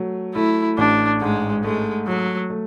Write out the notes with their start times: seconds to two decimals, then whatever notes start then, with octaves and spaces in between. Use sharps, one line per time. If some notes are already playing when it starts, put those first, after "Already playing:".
Already playing: F#3 A3
0.35 A3 E4
0.78 A1 D4
1.22 G#2 G#3
1.64 G#3 A3
2.07 F#3 A3
2.50 A3